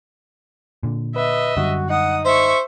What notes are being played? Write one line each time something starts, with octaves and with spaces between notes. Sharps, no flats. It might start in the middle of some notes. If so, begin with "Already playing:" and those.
A#2 D3
B4 D#5 E5
F#2 D3 G3 F#4
D#4 F#5 D#6
C5 E5 C#6